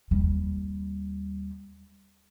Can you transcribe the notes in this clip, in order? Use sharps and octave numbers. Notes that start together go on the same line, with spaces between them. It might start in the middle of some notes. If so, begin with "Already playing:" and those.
D#2 G3